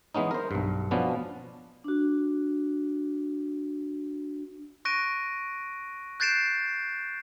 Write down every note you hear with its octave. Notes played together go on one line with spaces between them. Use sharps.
E3 G#3 B3 C#4 D#4
A#4 C5
B1 G2
B2 F3 B3 C#4 D4
D4 F#4
C#6 F#6 A#6 D7 D#7
F#6 G6 A6 C7 D7 E7